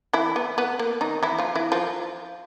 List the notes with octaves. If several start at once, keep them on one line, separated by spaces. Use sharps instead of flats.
E3 E4
B3
B3
A#3
D#3 D#4
E3 E4
F3 F4
E3 E4
F3 F4